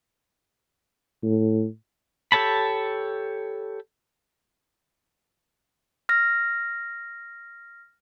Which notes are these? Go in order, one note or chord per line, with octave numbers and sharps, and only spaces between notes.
A2
G4 A4 C#5 A5 B5
F6 A#6